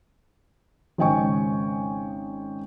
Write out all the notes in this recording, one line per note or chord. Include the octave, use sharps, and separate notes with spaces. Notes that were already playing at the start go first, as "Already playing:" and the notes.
G#1 C#3 D#5 G5 G#5 C#6